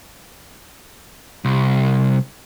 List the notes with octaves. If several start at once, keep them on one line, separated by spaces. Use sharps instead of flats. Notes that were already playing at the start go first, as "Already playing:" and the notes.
C2